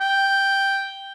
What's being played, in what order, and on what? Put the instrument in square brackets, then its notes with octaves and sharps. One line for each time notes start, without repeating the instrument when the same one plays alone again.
[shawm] G5